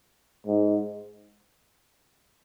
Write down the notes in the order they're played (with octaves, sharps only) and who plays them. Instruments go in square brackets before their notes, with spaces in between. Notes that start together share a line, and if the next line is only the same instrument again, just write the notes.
[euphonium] G#2